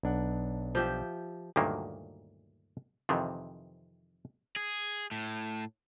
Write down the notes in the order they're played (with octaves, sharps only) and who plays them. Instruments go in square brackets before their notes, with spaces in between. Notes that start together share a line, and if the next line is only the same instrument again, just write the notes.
[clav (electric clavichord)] B1 D4 F#5
[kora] F3 G4 E5
[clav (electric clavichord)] D2 G2 A#2 D#3 F#3 A#3
F2 C3 D#3 E3
[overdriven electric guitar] G#4
A2